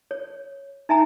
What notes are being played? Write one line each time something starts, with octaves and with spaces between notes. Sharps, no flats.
C#5
D#4 E5 G#5 A#5